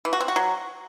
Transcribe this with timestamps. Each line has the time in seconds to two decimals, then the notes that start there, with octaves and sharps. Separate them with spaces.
0.05 E3
0.13 F#4
0.20 C4
0.28 F#4
0.36 F#3